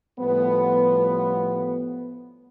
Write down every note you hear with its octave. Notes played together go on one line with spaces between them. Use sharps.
A2 F3 G3 B3